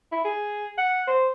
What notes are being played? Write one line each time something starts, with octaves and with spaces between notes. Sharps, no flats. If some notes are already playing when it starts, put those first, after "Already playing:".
E4
G#4
F#5
C5